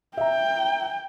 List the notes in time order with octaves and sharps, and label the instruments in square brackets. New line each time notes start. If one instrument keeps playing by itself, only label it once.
[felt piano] E5 A#5 [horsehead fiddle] G5